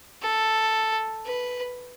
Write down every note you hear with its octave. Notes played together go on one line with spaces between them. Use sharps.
A4
B4